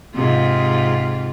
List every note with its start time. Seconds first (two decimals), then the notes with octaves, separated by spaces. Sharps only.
0.15 G#2 C3 F4